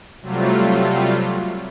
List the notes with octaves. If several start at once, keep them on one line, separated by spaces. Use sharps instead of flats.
C3 F#3 G3 A3 F4